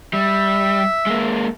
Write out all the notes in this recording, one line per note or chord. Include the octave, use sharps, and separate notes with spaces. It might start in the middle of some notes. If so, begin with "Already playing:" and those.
G3 E5
G#3 A#3